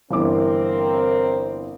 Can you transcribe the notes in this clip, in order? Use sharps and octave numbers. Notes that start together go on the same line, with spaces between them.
G1 E3 C4 A#4 D6